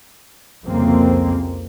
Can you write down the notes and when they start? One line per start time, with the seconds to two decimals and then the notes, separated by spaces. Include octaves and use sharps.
0.63 C2 F2 C#3 A#3 C4